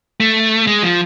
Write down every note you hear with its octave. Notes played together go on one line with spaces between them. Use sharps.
A3
G#3
F3